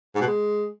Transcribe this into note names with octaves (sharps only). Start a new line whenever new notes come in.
G#2
B2
G#3